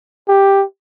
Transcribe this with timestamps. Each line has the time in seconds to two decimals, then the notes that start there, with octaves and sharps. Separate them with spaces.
0.28 G4